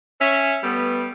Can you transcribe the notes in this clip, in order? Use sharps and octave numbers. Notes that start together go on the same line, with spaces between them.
C#4 E5
G3 A3 B3